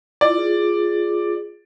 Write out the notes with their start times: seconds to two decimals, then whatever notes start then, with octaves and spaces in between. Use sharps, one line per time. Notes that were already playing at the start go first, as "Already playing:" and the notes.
0.21 E4 F4 D5
0.37 F4 G#4